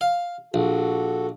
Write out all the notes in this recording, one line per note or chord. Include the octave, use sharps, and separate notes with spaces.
F5
A#1 F#4 A4